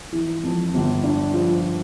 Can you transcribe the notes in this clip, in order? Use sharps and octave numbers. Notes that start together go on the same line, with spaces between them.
E3
F2
G1
D4
F3